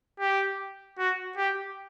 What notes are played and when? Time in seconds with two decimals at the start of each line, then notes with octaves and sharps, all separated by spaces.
0.20 G4
0.99 F#4
1.37 G4